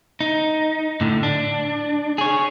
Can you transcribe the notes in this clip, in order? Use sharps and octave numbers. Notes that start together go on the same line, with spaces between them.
D#4
A2 D3
D4
G#4 C#5